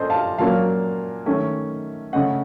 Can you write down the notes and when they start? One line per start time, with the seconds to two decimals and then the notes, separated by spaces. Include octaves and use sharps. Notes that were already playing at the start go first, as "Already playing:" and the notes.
Already playing: A#2 C#4 A4 C5 D#5
0.10 F5 A5
0.38 A#2 F#3 A#3 C#4 F5 A5
1.26 D#3 A3 C#4
2.13 C#3 A3 C#4 D#5 F#5